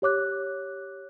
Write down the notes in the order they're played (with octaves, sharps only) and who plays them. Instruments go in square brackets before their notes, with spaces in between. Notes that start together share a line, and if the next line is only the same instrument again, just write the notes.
[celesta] G4 C#5 D6 F#6